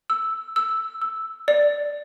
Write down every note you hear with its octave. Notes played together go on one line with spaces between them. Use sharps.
E6
E6
E6
D5